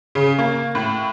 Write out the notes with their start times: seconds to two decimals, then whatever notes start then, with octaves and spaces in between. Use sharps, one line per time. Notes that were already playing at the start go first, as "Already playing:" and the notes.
0.15 C#3
0.39 A#3
0.75 A2